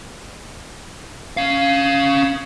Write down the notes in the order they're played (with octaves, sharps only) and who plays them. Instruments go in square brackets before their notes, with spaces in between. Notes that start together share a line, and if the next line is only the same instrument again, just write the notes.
[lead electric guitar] C#4 F5